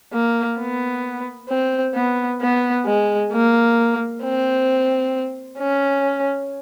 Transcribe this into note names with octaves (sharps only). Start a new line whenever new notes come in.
A#3
B3
C4
B3
B3
G#3
A#3
C4
C#4